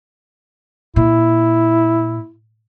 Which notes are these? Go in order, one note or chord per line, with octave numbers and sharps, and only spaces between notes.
A#2 E4